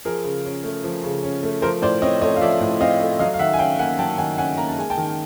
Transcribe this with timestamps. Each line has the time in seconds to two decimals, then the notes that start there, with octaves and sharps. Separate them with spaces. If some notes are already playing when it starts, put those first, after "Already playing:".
0.05 F3 G#4 A#4
0.24 C#3
0.45 C#4
0.64 A3
0.84 F3
1.04 C#3
1.23 C#4
1.43 A3
1.62 F3 A#4 C5
1.82 A2 C5 D5
2.02 C4 C#5 D#5
2.21 A3 C#5 D#5
2.36 F5
2.41 F3 D5 E5
2.61 A2
2.80 C4 D#5 F5
3.00 A3
3.19 F#3 D#5 F5
3.34 F5
3.39 D#3 E5 F#5
3.53 G#5
3.59 C#4 F5 G5
3.79 A#3 F#5 G#5
3.99 F#3 G5 A5
4.18 D#3 F#5 G#5
4.38 C#4 F#5 G#5
4.57 A#3 A#5
4.68 A5
4.77 G#3 G#5
4.90 G5 A5
4.98 D#3